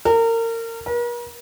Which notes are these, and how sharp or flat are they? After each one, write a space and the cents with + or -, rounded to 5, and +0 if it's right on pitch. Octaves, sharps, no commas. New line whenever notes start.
A#4 -30
A#4 +45